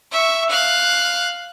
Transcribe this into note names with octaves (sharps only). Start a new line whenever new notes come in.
E5 C#6
F5 F#6